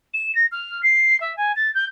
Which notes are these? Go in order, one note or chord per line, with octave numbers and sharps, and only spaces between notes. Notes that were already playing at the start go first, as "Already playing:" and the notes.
E7
A#6
F6
C7
E5
G#5
A6
G6